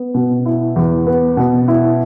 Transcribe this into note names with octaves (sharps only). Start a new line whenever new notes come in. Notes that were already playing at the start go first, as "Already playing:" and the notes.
Already playing: B3
B2
E4
E2
B3
B2
E4